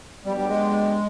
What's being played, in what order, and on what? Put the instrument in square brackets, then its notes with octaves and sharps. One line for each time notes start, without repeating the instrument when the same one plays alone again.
[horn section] F#3 B3 D4 G4 [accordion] G3
[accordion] G3
G#3